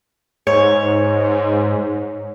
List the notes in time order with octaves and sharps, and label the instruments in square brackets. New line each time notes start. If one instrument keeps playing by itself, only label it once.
[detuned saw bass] G#2 [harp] C#5